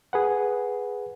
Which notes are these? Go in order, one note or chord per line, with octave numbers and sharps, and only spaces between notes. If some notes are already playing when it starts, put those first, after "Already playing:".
G#4 B4 F#5